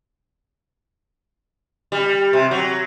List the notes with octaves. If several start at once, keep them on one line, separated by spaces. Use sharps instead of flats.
G3
C3
F#3